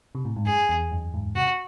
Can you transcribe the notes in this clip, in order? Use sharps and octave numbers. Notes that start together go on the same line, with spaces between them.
C3
A2
G#2
F#2 G#4
E2
F#2
G#2
C3 F#4